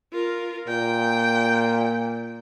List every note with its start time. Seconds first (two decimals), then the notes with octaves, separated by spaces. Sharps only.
0.13 F4 A#4
0.68 A#2 G5